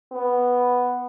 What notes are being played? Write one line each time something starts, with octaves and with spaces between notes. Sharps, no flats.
B3